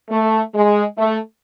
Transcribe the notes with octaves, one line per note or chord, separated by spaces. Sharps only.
A3
G#3
A3